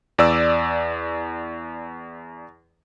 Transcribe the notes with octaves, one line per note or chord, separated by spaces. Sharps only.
E2 D5 E6